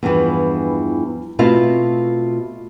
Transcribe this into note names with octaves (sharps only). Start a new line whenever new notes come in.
E2 G2 B2 E3 F3
B2 A3 C4 E4 F4 F5